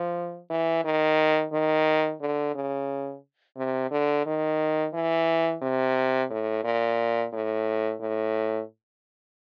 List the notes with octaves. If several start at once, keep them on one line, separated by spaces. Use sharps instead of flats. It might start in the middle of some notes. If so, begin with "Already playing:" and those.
Already playing: F3
E3
D#3
D#3
D3
C#3
C3
D3
D#3
E3
C3
A2
A#2
A2
A2